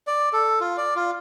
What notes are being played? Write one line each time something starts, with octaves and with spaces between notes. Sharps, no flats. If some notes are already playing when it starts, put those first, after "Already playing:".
D5
A4
F4
D5
F4